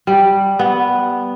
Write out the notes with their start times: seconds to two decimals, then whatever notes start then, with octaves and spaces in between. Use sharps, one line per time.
0.07 G3
0.59 B3